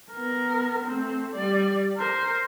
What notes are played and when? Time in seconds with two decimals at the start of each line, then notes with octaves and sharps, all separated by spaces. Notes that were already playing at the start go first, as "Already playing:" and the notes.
0.12 B3 A#4
0.85 A3 C4
1.36 G3 D5
1.97 A#4 C5